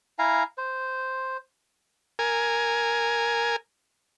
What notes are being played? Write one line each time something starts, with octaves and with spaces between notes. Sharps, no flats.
E4 F5 G#5 A#5
C5
A#4 G#5